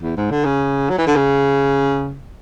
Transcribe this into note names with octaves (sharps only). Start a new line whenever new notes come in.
E2
G#2
D3
C#3
F#3
E3
D3
C#3